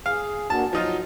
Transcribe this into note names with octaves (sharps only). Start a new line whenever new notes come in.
G#4 F5
A#3 D4 F#4 A5
F3 F#3 D#4 F4